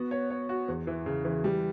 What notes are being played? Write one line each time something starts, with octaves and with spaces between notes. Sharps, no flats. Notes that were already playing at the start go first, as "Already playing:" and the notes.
Already playing: B3 F#4
C#5
C#5
F#4
E2
E3
C#3
E3
G3